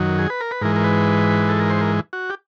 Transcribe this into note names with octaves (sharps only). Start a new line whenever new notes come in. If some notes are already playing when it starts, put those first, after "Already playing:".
Already playing: F#2 D#3 F#3
G#4
B4
A#4
B4
G#2 E3 G#3 A#4
A#4
B4
A4
A#4
C5
A#4
F#4
G4